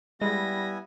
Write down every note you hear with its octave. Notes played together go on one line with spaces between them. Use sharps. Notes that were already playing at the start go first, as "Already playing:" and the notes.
G3 G#3 B3 E4 G#5 B5 A#6